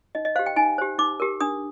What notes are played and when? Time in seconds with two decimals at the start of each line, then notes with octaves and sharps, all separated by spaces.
0.15 D#4 D#5
0.25 D#5
0.36 G4 C5 F5
0.46 G5
0.56 D#4 G#5
0.78 G4 C5
0.98 D#4 D6
1.20 G4 A#4
1.40 D4 D#6